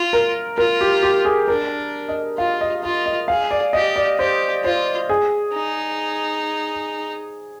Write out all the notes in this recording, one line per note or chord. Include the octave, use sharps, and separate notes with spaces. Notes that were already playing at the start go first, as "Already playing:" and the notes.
Already playing: F4
A#4
F4 A#4
G4
G4
G#4
D4 A#4
D#5
F4 F5
D#5
F4 F5
D#5
G#4 F5
D5
G4 D#5
D5
G4 C5
F4 C5
G#4
D#4